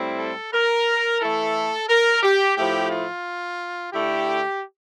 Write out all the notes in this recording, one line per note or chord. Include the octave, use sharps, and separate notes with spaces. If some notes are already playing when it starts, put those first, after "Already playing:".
Already playing: A2 G3 C4 E4
A4
A#4
E3 A3 E4 A4
A#4
G4
A2 F3 A3 E4 G4
F4
D3 A3 E4 G4